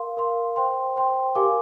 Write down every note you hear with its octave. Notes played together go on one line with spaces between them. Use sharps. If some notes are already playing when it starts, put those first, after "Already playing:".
Already playing: A#4 F5 C6
A#4 F5 C6
C5 G5 C6
C5 G5 C6
G4 A#4 F5 G#5 D6